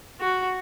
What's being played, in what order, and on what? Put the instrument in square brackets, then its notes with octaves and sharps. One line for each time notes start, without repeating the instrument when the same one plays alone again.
[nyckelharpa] F#4